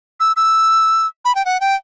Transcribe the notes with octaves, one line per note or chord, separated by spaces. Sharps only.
E6
E6
B5
G5
F#5
G5